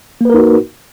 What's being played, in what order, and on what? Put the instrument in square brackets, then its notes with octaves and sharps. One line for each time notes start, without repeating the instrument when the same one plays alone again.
[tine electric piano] A#3
B4
A#4
D#4
F#4